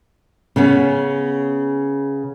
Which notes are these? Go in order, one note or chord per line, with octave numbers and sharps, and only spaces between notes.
C#3 B3 C#4